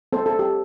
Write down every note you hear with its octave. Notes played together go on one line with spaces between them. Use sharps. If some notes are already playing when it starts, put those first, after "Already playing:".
C4 A4 C5
A4
C4
G4